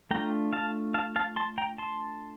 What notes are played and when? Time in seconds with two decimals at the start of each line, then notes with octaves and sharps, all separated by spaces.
0.11 A3 D4 F4 G5 A#5
0.53 F5 A5
0.94 F5 A5
1.16 F5 A5
1.36 A5 C6
1.58 G5 A#5
1.78 A5 C6